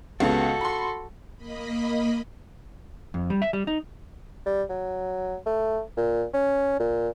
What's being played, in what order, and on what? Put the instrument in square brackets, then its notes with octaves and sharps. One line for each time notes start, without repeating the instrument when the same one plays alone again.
[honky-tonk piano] C#2 C#3 B3 [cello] F#4 A4
[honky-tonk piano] B5 C6
[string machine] A#3 D#5 B5
[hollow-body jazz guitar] F2
G3
E5
G3
D#4
[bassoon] G3
F#3
A3
A#2
C#4
A#2